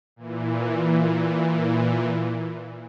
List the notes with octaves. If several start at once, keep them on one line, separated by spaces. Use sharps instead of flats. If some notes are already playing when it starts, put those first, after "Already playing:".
A#2 E3